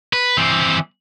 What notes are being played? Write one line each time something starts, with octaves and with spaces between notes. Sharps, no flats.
B4
E3 C4